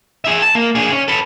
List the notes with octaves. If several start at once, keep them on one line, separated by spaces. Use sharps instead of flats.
G#4 E5
A5
A#3
D4 G#4
C#4
A4 B4